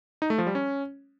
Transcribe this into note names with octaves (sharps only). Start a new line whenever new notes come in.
D#4
A3
F3
G3
C#4